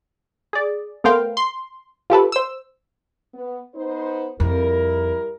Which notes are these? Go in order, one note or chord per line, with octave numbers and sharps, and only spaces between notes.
G#4 D5
A3 B3 A#4 C5 F5 G5
C6
F4 G4 A4 B4
C5 E6
B3
B3 D#4 C5
F2 G3 E4 A#4